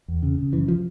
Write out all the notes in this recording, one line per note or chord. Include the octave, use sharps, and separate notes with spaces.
E2
C#3
C#3
F#2 E3
F3